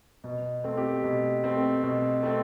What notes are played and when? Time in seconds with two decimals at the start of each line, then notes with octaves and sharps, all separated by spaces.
0.24 B2
0.64 A3 C4
0.77 G4
1.04 B2
1.44 A3 C4
1.83 B2
2.23 A3 C4